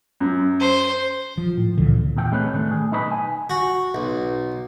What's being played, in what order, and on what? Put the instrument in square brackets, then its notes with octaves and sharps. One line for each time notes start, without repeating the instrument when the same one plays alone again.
[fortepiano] F#2
[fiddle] C5
[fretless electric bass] F3
[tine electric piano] A2
[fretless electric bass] C#2 A#2 E3 [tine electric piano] D3
[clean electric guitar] E2 A#2 G5
C3 G#3 A3 C#4 B4
A2 D3 D#3 A3
G#4
B1 D#4 B4 C5 B5
G#5
[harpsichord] F#4
B1